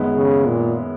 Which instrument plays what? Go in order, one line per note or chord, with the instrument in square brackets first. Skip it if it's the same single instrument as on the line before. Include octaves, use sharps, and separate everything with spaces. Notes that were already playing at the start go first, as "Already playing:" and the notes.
Already playing: [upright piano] F#2 D#3 G#3 B3
[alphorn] C#3
A#2